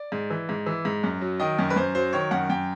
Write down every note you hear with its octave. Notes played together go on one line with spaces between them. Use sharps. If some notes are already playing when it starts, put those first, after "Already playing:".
Already playing: D5
G#2
E3
G#2
E3
G#2
F#2
F#3
D#3 D#5
F#2
B4
F#2 C5
F#3 C5
D#3 C#5
F#2 F#5
F#2 G5